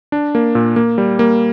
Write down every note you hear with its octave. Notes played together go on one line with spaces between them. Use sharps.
D4
A#3
A#2
A#3
G3
A#3